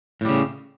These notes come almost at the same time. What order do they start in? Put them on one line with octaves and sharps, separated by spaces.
A2 G3 C#3